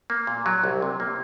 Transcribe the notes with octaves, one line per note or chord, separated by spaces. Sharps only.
A#3
A#2
F#3
C2
C3
A#3